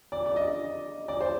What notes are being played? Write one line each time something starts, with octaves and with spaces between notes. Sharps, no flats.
D5
D5
D#5
D5
C5